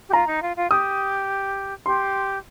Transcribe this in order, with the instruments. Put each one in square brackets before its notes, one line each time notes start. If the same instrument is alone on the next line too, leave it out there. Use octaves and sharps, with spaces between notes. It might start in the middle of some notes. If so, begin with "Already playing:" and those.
[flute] G4
[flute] F4 [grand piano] A#5
[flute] D#4
F4
F4
[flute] G4 [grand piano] D#6
[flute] G4 [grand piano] C6